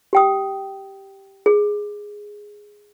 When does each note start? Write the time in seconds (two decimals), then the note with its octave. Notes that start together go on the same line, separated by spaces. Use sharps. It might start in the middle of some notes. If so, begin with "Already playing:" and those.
0.13 G4 G5 D#6
1.46 G#4